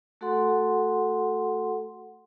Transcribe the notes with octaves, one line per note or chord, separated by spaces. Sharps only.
A3 F#4 A4 F#5 C6